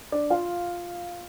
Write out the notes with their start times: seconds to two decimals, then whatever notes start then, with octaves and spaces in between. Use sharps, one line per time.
0.12 D4 D5
0.30 F4 F5